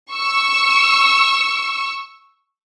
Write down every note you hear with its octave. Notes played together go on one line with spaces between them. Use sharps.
C#6 E6